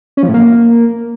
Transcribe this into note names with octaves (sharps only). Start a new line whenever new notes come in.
C#4
F3
A2
A#3